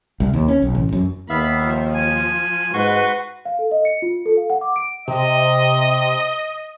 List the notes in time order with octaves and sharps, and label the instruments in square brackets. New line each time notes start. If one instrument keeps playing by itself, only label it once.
[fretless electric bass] C2
D#2
C#4
B1
A1
F#2
[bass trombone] D#2 [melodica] B3 E5 F5 [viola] B5
[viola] F3
[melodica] G#5
[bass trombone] G#2 [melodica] F#4 C6 C#6 [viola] B4
[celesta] F5
A4
D#5
C#7
F4
A4
F5
F#5
D6
D7
[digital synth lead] C3 [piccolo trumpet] D#5